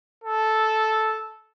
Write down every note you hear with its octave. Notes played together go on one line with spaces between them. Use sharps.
A4